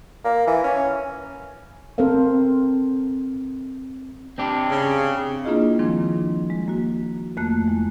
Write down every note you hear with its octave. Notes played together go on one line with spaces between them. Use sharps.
A#3
E3
C#4
C4 A4 A#4 C5 F5
C4 D4 G4
C#3
A#3 D4 E4 F4 G#4 D#5
D#3 F3 G3 G#3 C4 D4
G#3
A#3 F#4
F2 A3 A#3 F#6
G#3 E4